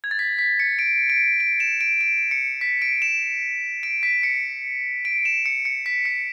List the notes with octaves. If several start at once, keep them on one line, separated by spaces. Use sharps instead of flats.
G#6
A6
B6
B6
C#7
D7
D7
D7
E7
D7
D7
C#7
B6
D7
E7
D7
B6
C#7
D7
E7
C#7
C#7
B6
C#7